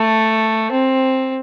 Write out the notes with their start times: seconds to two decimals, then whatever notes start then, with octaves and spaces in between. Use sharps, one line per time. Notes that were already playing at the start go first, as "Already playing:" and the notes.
Already playing: A3
0.72 C4